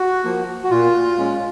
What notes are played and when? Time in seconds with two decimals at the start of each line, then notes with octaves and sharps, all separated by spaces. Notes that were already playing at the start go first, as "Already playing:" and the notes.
Already playing: F#4
0.24 F3 A#3
0.64 F#4
0.71 A#2 F4
1.18 G#3 C#4